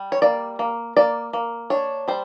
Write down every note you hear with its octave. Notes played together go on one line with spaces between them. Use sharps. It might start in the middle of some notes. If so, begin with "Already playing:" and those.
Already playing: G3
C#5
A#3 D5
A#3
A#3 D5
A#3
D4 C#5
G3 C5